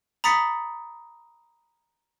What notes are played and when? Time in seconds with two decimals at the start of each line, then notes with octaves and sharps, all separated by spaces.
0.24 A#5 B5 D#6 A6 B6 C#7